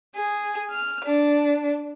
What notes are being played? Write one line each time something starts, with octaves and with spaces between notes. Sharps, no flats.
G#4
F6
D4